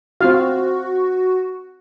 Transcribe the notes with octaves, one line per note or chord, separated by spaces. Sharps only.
C4 F4 F#4 F5